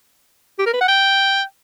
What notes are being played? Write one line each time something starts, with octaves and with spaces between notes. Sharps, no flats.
G4
A#4
B4
F#5
G5